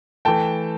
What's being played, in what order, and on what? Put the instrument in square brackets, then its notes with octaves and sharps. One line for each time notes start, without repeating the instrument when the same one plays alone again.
[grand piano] E3 A3 G5 A5